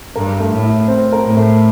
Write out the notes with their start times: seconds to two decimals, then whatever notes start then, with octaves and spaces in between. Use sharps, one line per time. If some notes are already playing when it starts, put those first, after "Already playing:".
0.16 G2 A#4
0.40 A3
0.52 A2
0.64 E4
0.88 C4
1.12 A#4
1.24 A2
1.37 A3